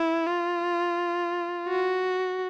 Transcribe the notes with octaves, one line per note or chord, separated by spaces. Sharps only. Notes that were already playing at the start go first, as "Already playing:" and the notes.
Already playing: E4
F4
F#4